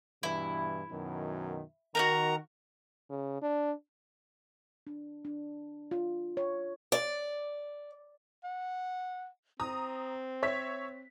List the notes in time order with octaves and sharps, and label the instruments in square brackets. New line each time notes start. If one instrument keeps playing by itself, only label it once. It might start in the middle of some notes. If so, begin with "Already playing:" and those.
[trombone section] G2 B2 E3 [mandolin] E4
[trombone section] F#2 B2 D#3
[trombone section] D#3 [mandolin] F#4 G4 A#4 [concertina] A#5
[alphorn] C#3
D4
[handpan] D4
D4
F4
C#5
[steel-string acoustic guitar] D5
[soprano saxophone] F#5
[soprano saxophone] C4 [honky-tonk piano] A#5 D#6
[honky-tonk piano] C#5 E5 B6